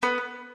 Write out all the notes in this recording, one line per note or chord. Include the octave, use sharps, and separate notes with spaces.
B3